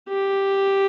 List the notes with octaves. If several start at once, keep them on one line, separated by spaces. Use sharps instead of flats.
G4